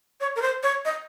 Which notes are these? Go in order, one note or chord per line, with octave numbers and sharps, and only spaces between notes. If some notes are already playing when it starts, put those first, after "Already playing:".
C#5
A#4
C5
C#5
D#5